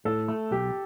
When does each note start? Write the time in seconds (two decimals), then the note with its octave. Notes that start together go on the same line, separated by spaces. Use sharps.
0.05 A2 A4
0.28 A3
0.51 B1 G4